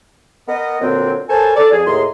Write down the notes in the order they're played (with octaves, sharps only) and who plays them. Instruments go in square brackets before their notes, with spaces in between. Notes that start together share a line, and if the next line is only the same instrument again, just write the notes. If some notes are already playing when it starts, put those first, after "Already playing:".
[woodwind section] B3 A#4 D#5
A#2 D3 F#3 C4
A4 A#4 C5 C#5 G#5 A5
A4 D5
F2 G#4
D#2 A2 G#4 A#5 C6